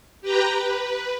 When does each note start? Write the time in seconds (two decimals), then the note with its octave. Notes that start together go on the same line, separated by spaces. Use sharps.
0.21 G4 B4 G5 A#5
0.56 B4